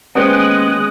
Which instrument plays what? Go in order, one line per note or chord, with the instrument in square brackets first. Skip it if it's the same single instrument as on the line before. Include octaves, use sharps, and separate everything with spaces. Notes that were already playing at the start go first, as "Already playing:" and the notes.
[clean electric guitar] D#2 C#4 G5 [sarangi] G#3 [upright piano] B3 C5 [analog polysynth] D#6 F#6